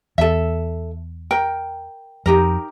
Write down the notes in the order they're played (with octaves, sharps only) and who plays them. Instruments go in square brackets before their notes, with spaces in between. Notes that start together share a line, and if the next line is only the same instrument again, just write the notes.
[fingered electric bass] E2 [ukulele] A4 E5
[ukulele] A#4 G5
[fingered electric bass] F2 [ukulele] D#4 G4 A#4